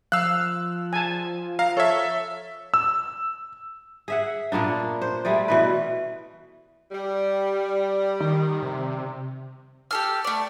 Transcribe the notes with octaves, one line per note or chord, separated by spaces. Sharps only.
F3 F5 E6 F#6
G#5 A5
F5 A#5
A4 C#5 E5
E6
G#4 E5 F#5
A#2 A#3 B3 D4
C5
G3 A3 G#4 D5
B2 E3 B4
G3
D#3
C3
G4 A4 F6
A3 D5